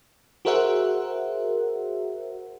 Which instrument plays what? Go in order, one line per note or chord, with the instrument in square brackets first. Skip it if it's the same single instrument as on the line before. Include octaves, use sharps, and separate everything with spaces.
[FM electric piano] F#4 G#4 A#4 C5 E5 F#5